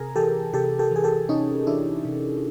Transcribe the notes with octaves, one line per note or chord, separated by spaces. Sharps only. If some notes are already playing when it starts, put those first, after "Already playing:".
Already playing: C3 G#4 A#4
E3 G4 A4
C3 G4 A4
G4 A4
E3 G#4
G4 A4
C3 C#4 D#4
E3 D4 E4
C3